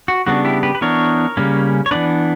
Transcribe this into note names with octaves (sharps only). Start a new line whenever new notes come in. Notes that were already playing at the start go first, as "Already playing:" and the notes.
F#4
C#3 G3 B3 D4 F#4
E4 G4
G4 B4
B4
E3 B3 D4 A#4 C#5
C#3 G3 A#3 C#4
C#5
E3 B3 D4 B4 D5